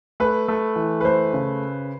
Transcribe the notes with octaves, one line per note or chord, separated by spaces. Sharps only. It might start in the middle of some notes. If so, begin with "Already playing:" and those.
A3 B4
A3
E3
B4
A3 C5
C#3